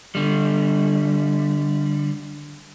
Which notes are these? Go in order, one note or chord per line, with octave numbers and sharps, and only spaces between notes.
D3 G3